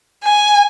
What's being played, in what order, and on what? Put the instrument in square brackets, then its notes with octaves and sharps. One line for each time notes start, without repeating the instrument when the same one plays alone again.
[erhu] G#5